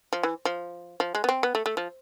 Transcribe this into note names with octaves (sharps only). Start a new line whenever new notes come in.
F3
E3
F3
F3
G#3
B3
C4
B3
A3
A3
F3